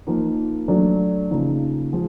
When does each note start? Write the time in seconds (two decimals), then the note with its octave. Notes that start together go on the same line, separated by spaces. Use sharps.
0.07 F3 A#3 D#4
0.68 F#3 A3 D4
1.30 C#3 F3 A#3 D#4
1.93 F3 G#3